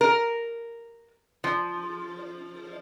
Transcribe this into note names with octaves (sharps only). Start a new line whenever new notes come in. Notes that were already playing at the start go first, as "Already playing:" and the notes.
A#4
F3